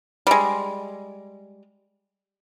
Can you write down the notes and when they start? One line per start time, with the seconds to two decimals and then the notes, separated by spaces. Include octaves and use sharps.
0.27 G3 G#3